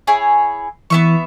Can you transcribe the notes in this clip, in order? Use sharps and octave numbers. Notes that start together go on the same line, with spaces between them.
E4 G#4 C#5
E3 B3 E5 C#6